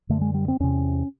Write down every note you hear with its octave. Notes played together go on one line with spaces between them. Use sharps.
F#2 D3 A3
G#3
G3
C4
E2 C3 C#4